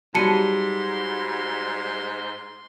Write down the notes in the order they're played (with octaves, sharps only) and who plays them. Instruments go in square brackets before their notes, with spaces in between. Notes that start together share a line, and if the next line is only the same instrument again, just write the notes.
[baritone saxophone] G#2 [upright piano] F#3 G3 [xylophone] A5 C#7 D#7 [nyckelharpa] C6